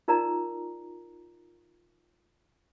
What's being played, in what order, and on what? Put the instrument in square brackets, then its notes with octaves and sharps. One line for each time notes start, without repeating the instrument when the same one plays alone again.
[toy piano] D#4 F4 A#4 D5 A#5